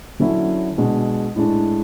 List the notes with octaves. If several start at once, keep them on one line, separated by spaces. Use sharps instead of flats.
D3 F#3 C#4 E4
B2 G#3 D4
A2 G#3 D4